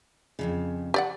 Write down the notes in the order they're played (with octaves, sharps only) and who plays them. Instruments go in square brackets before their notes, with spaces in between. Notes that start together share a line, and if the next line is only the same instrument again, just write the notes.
[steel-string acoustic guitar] F2 G#2 C#3
[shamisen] G4 D5 F#5